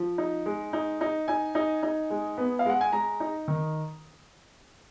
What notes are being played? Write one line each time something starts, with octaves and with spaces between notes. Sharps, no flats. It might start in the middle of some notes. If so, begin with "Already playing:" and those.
Already playing: F3
D#4
G#3
D#4
D#4
D#4 G#5
D#4
D#4
G#3
B3
F5
G#3 F#5
G#5
G#3 A#5
D#4
D#3